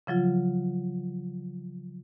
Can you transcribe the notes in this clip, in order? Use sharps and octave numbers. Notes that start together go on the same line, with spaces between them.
C#3 F3 F#3 F4